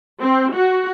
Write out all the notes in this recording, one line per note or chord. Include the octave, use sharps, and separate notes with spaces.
C4
F#4